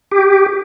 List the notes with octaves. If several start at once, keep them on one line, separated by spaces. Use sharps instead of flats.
G4